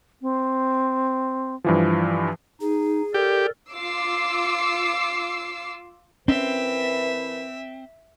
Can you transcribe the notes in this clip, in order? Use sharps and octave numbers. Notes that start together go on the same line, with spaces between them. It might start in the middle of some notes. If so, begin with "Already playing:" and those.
C4
G2 E3 F3
D#4 G#4
G4 A4 A#4 D5
F4 D6 E6 C7
E3 C4 C#4 A#4 B4 E5